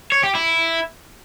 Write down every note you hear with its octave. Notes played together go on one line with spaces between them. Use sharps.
C#5
G4
E4